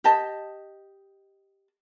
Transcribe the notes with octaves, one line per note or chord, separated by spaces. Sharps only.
G4 D#5 A5